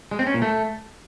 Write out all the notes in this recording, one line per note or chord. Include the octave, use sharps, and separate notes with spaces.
G#3
C4
C#4
A#2
A3